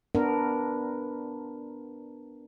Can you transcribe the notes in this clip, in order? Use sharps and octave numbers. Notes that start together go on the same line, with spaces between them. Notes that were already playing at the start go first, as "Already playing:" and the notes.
B3 D4 A#4